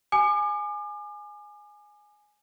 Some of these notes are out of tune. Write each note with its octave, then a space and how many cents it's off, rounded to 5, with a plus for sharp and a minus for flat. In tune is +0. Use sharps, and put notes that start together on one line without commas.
G#5 +5 D6 +40